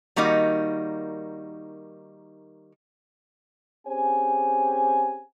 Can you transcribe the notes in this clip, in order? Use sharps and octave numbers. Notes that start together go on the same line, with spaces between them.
D#3 G3 A#3 D#4 F#4
C4 C#4 G4 G#4 C5 G#5